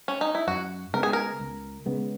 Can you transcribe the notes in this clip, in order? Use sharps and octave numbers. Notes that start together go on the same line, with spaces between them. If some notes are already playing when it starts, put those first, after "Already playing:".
C#4
D#4
E4
F#2 F#4
C#3 G#3 B3 A#4
G#4
A#4
C#2
C#3 G#3 B3